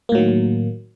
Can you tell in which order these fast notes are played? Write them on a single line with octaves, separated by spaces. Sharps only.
A#3 A2 F#3 D#3